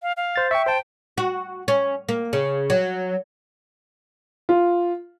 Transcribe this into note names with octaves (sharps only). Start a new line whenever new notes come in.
F5
F5
C5 A6
E5 G5 C#6
C5 G5 A5
F#4
C#4
A#3
C#3
F#3
F4